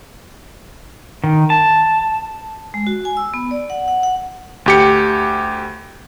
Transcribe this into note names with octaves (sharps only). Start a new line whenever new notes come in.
D#3
A5
G#3
F#4
G#5
E6
B3
D5
F#5
F#5
F#5
D2 G4 C#7